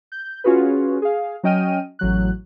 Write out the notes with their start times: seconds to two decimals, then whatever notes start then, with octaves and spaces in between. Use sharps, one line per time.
0.12 G6
0.44 C#4 F4 F#4 G#4 B4
1.02 G#4 F5
1.43 F#3 C#4 D#5 G5 F6 D#7
1.99 A1 F#3 F#6